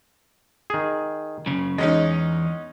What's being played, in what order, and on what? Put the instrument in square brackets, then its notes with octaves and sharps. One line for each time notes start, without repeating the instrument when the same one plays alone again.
[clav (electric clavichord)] D#3 G#4
[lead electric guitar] F#2 C#3
[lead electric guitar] E2 [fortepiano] G#3 C#4 D#4 [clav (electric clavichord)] D#5